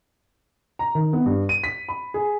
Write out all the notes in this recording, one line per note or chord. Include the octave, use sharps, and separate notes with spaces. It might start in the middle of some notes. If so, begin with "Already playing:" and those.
A#5
D#3
B3
G2
D#7
B6
B5
G#4